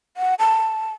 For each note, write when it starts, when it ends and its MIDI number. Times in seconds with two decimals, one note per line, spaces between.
0.17 0.34 78
0.39 0.92 81